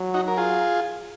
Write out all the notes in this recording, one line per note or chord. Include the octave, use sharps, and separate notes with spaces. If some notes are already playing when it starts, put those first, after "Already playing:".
Already playing: F#3
D#4 F#4
A#4
F4 G#4